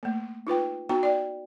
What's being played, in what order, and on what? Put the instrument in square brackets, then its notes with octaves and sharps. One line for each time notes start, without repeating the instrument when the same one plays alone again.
[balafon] A3 A#3
D#4 F4 B4 G5
B3 D#4 F#4 G5 A#5
D5 G5